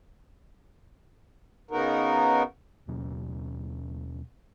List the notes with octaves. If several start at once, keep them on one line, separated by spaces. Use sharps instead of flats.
C#3 B3 D#4 F#4 A#4
D#2 B2 F#3 C#4